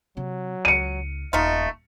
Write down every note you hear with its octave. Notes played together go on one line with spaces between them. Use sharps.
C3 F#3
C#2 C#7 D#7
D#1 A3 D#4 F4 D#5